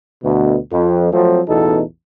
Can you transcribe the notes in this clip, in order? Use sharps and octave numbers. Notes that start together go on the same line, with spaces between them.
D2 B2
F2
F3 F#3 A3 C4
A1 E2 B2 D#4 A4